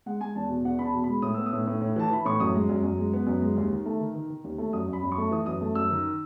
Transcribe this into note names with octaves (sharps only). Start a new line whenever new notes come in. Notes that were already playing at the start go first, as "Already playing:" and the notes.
G#3 F#5
G#3 G#5
E2 A5
B2
E2 F#5
E2 B5
A5
B2
G#3 B5
A2 D#6
B3 E6
D#6
A2
A2
A2
E3 A5
E3 B5
A2 C#6
F#2 D#6
G#3
F#2
F#2
G#3
B3
F#2
G#3
D#2
D#3
A3
D#3
D#3
D#3
D#2
A3
F#2 D#6
F#2
B5
F#2
C#6
A3
E3 D#6
F#2 D#6
A3
F#2 E6
D#3